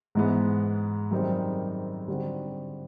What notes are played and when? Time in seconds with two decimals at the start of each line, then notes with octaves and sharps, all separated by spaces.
0.15 G#2 E3 G#3 B3
1.11 F#2 D#3 G3 C4 D#4
2.08 D3 G3 C4 D#4 F#4